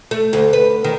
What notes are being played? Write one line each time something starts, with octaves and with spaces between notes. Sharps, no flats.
A3
D2
B4
D#3